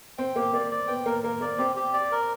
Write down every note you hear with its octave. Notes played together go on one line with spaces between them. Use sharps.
C4 G5
A#3 G4
A#3 D5
D5
B3 G5
A#3 A#4
A#3 A#4
A#3 D5
C4 G4
G4
D5
A#4